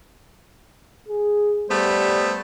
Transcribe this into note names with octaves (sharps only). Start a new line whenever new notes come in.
G#4
G3 A3 B3 C5